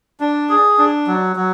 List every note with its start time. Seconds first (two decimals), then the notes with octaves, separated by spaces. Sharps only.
0.20 D4
0.49 G#4
0.78 D4
1.07 F#3
1.36 F#3